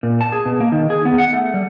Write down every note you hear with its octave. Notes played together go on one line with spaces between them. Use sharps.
A#2
A5
G#4
B2
A#3
D#3
G#4
B3
F#5
A3
G3